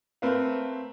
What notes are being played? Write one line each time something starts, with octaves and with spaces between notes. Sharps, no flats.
A3 C4 A#4 B4 F5